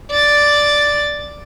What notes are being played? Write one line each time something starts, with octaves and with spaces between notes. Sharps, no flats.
D5 A6